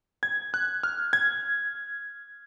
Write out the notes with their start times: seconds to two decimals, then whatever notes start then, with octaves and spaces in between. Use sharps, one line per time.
0.23 G#6
0.54 F#6
0.83 F6
1.13 G#6